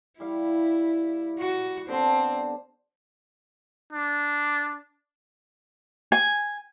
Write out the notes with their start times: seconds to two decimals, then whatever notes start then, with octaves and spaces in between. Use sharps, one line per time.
0.20 G3 E4 F5
1.39 F#4
1.89 D3 B3 C4 D4
3.92 D4
6.12 G#5